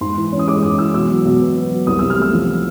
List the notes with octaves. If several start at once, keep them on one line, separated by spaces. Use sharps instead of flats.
G#2 C6
E3
C#4
D#6
G#3 D6
G#2 D#6
E3 E6
B2 E6
F#3
B2
B3
B2
F#3
C2 D#6
E6
C3
F6
A3 E6
F3